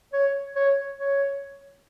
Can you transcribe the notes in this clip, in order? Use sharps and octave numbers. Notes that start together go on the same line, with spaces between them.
C#5
C#5
C#5